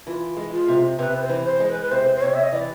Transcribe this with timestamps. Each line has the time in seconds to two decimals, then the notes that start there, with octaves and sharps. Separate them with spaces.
0.07 E3 F4
0.37 G#3
0.52 F4
0.68 C3
0.99 C3 B4
1.22 C5
1.29 E3
1.45 C5
1.60 G#3
1.69 B4
1.82 B4
1.91 C3 C5
2.16 C5
2.22 C3 C#5
2.34 E5
2.43 D#5
2.53 E3 D5